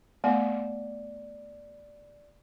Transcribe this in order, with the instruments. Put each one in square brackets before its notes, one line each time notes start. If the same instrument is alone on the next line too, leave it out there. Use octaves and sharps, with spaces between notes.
[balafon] A3 B3 F#5 [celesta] D5